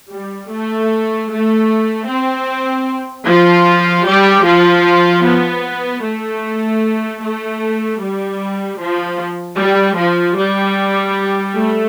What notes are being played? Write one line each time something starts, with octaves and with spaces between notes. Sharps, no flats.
G3
A3
A3
C4
F3 F4
G3 G4
F3 F4
B3
A3
A3
G3
F3
G3
F3
G3
A3